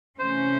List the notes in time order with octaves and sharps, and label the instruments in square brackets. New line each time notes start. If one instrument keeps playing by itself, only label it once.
[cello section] C3 E3 A3 C#4 [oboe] C5